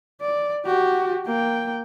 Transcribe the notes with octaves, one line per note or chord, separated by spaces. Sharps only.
D5
F#4 G4
A#3 G5